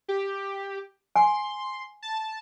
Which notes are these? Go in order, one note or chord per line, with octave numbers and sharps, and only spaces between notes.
G4
G#5 C6
A5